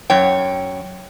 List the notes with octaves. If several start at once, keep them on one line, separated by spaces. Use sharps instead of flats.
F#2 C#5 G5